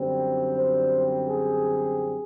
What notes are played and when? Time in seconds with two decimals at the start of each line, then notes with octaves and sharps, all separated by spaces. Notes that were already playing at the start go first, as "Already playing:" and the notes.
Already playing: F#2 D3 G3 C4
0.56 C5
1.27 G#4